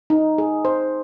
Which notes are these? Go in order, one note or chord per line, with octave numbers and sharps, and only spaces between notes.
D#4
G#4
C5